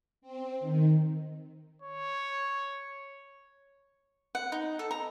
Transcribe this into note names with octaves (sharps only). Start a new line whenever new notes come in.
C4
D#3
C#5
F#5
D#4
A4
A#5